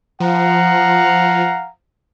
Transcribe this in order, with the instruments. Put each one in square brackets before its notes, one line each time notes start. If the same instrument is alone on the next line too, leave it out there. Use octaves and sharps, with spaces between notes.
[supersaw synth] F3 [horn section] F5 F#5 A#5